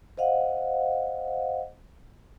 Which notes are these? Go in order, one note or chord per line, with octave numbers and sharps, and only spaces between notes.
C5 D#5 F5 F#5